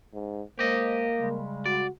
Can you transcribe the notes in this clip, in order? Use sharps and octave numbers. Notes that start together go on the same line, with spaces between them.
G#2
G#3 A#3 G4 C5 D#5
C#3 G3 G#3
F#4 D5